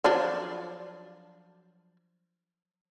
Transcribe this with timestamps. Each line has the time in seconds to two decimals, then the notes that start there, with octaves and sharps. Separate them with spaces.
0.04 F3 F#3 D4